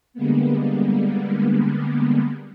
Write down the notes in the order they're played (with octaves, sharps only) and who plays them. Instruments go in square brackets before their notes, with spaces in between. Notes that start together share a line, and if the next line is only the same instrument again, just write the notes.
[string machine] D3 G3 G#3 A#3 B3